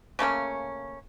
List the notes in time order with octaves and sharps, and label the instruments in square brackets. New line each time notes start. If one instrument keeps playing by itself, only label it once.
[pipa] C#3 A3 A#3 C#4